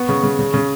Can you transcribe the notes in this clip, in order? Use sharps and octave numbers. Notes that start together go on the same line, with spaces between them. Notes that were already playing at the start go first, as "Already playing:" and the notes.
Already playing: B3 C#6
C#3
C#3
C#3
C#3